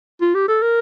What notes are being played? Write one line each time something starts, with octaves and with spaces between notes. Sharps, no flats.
F4
G4
A4
A#4